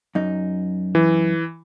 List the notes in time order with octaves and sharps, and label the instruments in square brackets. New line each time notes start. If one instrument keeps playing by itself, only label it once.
[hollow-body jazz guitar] F#2 D#4
[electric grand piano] E3